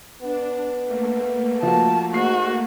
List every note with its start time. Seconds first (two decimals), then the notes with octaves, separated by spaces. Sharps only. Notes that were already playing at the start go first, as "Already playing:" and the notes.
0.21 B3 D4
0.85 A3 A#3
1.63 F3 F#4 A5
2.14 G#2 F#4 C7